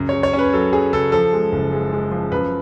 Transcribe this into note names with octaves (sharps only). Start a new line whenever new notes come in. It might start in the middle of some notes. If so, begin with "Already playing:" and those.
Already playing: C#2 F#2
C#5
C#3
C#5
C#4
B4
F#3 A4
F#3 G#4
C#3 A4
F3 A4
G#3
F#1
G#3
G#3
F3
F#2 B4